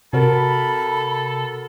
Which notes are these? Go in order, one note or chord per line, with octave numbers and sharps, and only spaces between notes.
C3 F#4 A4 A#4 B5